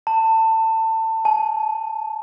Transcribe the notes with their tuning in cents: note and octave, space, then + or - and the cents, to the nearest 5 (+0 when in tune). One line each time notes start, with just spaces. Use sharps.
A5 +25
A5 -45